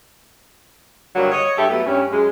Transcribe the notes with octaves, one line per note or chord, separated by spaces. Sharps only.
G2 D3 F#3 G3 A#3
C#5 D#5
G2 G4 A4 E5
F#3 A3 B3 E4
G2 C#4
F#2 G#3